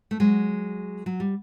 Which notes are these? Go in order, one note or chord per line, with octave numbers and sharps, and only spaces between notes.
A3
F#3 G#3
F#3
G3